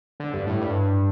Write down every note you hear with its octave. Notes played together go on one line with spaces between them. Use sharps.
D3
G2
A2
G2